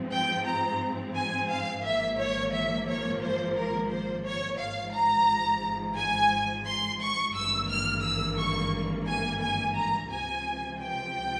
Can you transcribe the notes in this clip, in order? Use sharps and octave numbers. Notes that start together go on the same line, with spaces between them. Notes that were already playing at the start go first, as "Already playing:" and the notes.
Already playing: G#2 F3 C4
G5
A#5
G#5
F5
G#1 G#2 F3 A#3 E5
C#5
E5
C#5
C5
A#4
C5
C#5
G#1 G#2 F3 F5
A#5
G#5
C6
C#6
G#1 G2 E3 A#3 E6
F6
E6
C#6
G#5
G#5
A#5
C#2 C3 F3 G#5
G5